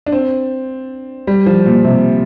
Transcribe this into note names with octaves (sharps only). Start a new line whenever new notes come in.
D4
C4
G3
F3
A#2
C3